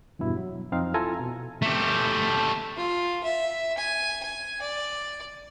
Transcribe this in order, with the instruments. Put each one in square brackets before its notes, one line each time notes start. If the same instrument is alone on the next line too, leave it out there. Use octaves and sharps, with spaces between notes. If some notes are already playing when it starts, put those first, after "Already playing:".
[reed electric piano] E2 G2 B2 E4
F#3
F2 C4 D#4 F5
E4 F4 A4 G#5 A#5
B2
[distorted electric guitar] A3 G4
[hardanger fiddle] F4
E5
G#5
G#5
D5